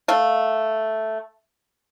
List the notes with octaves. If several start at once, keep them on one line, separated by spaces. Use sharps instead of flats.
A3 F5